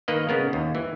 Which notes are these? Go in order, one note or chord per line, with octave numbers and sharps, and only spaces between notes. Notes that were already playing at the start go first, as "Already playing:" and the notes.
D#3 A#3 B4 D#5
C#3 B3 A#4
D#2
E3